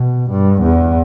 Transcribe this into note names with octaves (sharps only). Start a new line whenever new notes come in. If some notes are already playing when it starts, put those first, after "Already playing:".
Already playing: B2
G2
E2